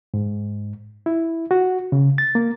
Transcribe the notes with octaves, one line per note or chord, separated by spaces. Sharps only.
G#2
E4
F#4
C#3
A6
A#3